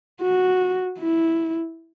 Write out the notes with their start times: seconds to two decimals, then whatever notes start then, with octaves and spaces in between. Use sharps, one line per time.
0.21 F#4
0.99 E4